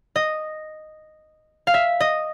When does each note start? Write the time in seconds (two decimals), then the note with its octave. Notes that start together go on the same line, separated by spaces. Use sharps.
0.16 D#5
1.67 F5
1.74 E5
2.00 D#5